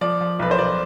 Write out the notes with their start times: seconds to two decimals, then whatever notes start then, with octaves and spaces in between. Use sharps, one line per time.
0.01 F3 D5
0.21 F3
0.39 B1 B4
0.51 C5
0.58 B1 D5